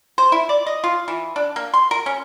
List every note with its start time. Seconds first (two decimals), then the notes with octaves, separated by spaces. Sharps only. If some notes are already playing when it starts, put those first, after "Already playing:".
0.18 C5
0.32 E4
0.49 D5
0.66 D#5
0.84 F4
1.08 E3
1.36 D4
1.56 A#3
1.74 C6
1.91 A#4
2.06 C#4